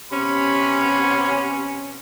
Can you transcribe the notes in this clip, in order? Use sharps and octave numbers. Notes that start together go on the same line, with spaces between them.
C3 B3 C#4 B5